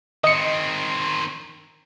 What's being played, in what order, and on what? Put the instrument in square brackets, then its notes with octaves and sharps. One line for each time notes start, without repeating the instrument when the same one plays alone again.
[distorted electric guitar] D#3 C4 [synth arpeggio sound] D#5 C#7